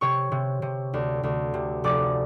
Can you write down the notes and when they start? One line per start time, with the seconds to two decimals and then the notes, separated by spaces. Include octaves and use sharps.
0.01 C3 C#5 C#6
0.32 C3
0.62 C3
0.93 D2
1.23 D2
1.54 C3
1.84 F1 D5 D6